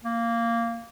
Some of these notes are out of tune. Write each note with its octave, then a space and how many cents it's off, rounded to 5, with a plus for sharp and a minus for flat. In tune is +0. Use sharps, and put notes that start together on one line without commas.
A#3 -10